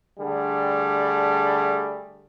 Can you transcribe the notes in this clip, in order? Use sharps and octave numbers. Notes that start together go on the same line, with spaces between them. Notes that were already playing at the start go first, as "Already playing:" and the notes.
D3 G3 A3 G#4